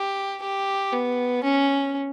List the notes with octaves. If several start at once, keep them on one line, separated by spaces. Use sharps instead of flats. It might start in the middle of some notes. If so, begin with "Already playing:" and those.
Already playing: G4
G4
B3
C#4